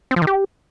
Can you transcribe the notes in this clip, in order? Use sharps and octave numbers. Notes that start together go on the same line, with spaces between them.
C4
F3
D#3
G4